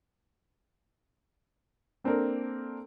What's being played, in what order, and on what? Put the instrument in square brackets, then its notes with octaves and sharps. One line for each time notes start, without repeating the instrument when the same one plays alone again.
[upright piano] A#3 C4 D4 A4 A#4